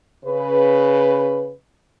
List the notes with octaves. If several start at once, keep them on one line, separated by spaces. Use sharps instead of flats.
C#3 B4